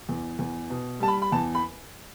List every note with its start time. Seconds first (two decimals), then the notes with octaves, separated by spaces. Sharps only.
0.09 E2
0.39 E2
0.70 B2
1.00 G3 A5
1.08 B5
1.22 B5
1.32 E2 A5
1.55 B5